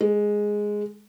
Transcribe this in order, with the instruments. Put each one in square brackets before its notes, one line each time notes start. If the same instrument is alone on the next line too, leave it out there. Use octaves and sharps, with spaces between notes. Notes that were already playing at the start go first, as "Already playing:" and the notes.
[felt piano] G#3